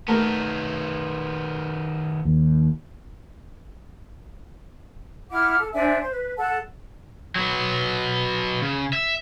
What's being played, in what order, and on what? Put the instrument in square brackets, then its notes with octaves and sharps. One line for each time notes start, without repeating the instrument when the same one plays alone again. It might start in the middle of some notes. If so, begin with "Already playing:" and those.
[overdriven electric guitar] D#3 B3 [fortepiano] A3 A#4
[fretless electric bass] D#2
[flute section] E4 F#5 D6 F6
A4
D4 C5 E5 G#5
C5
B4
A4 F#5 A5
[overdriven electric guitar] F#3 B3
C#3
E5